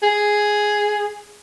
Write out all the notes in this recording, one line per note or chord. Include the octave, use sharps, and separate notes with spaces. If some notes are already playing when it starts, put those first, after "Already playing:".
G#4